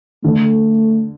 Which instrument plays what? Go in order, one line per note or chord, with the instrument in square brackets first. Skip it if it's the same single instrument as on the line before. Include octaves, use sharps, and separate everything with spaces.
[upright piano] D3 [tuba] A3